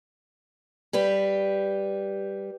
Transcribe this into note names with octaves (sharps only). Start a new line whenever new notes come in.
G3 G4 B4